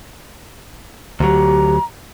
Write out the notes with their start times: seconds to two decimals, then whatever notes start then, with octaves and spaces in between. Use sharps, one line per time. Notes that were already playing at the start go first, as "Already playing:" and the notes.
1.20 D2 F#3 G4 A#5